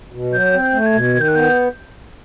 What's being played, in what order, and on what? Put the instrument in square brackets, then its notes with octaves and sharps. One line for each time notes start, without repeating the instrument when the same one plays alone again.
[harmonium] B2
[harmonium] F#3 [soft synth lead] G6
[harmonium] C4
[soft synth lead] G6
[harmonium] A3
[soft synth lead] G#6
[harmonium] B2
[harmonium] D#3 [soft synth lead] G#6
[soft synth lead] G6
F#6
[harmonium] B3 [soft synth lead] G6